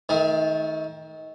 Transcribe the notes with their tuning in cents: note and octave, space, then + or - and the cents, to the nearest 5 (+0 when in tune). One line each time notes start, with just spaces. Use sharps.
D#3 +25 A3 -15